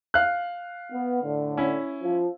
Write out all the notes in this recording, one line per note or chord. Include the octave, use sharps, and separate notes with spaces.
F5 F#6
B3
A2 D3
C#4 E4
F3